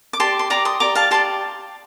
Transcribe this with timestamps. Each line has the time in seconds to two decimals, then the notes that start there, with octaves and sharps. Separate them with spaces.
0.13 D6
0.20 G4 D5 A5 C6
0.39 C6
0.50 G4 D5 A#5 D6
0.65 C6 D#6
0.80 G4 D5 A#5 D6
0.95 F5 A5
1.11 G4 D5 A5 C6